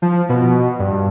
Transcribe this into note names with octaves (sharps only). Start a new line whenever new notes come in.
F3
B2
G2